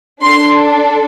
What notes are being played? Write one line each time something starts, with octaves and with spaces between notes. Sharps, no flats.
D4 A4 C6